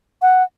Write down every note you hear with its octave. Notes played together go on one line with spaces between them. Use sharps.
F#5